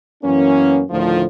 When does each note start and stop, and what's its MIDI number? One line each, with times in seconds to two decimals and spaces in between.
0.24 0.82 42
0.24 0.82 52
0.24 0.82 58
0.24 0.82 59
0.24 0.82 61
0.91 1.25 38
0.91 1.25 45
0.91 1.25 50
0.91 1.25 51
0.91 1.25 53